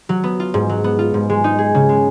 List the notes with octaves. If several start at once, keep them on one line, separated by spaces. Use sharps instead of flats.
F#3
B3
F4
G#2
F#3
B3
F4
G#2
G#3
D#4
G#4
C#3
G#3